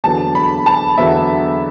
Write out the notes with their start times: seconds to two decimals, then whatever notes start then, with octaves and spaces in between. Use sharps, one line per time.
0.04 E2 D3 F#3 B3 A5
0.35 B5
0.66 A5
0.98 E2 D3 F#3 B3 E5